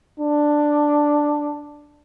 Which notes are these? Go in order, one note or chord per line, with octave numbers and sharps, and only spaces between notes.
D4